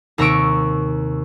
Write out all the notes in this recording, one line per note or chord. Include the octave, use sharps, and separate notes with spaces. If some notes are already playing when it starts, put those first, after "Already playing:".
D#2 C3 A#5 C#6 E6 D7